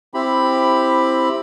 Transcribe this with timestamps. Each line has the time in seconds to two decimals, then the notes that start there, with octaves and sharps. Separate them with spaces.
0.14 C4 E4 G4 B5